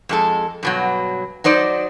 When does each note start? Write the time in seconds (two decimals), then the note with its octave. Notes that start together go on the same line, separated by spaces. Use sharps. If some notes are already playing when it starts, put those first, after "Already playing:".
0.09 F2 G#3 A4
0.63 G2 B2 F#3
1.44 F#3 D#4 C5 D5